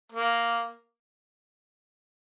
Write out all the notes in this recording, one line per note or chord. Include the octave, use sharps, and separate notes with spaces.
A#3